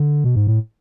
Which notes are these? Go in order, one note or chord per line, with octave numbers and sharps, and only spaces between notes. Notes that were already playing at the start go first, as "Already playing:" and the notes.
Already playing: D3
B2
G#2
A2